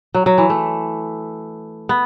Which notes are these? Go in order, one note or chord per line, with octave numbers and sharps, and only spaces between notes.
F#3
F#3
E3
A3
B3